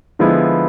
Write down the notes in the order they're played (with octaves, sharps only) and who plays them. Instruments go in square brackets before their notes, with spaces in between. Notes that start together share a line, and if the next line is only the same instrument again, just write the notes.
[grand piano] D3 F3 G#3 B3 E4